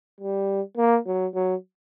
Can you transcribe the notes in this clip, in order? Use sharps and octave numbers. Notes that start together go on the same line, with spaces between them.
G3
A#3
F#3
F#3